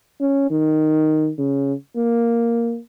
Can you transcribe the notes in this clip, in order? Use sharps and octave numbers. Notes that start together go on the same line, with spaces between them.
C#4
D#3
C#3
A#3